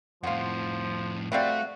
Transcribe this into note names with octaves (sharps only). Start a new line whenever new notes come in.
F2 A2 F3 F4 F#4
G3 A3 C4 E4 F#4 F5